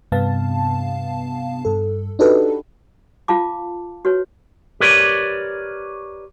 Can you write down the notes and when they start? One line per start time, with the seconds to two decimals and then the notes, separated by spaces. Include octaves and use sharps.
0.12 G2 C3 B3 F5 A5
1.65 G2 A4
2.19 D4 D#4 F#4 G4 A4 B4
3.28 F4 F5 A5 D6
4.05 F#4 B4 C#5
4.80 G4 A#4 B4 C#5 D5